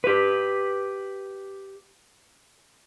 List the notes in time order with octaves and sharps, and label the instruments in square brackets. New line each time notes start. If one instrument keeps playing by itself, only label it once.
[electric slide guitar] G4 B4